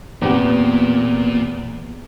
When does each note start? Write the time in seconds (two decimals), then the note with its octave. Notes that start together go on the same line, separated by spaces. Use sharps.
0.22 E2 A#2 B3 C4 G4